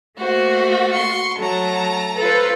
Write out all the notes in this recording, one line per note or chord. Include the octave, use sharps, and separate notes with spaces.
A3 A#3 F#4 C5
C6 C#6
F#3 A3 A5 A#5
F4 A4 B4 C5